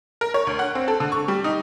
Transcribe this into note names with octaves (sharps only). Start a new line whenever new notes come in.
A#4
C#5
D2
F#5
C4
A4
D3
C#6
G3
D#4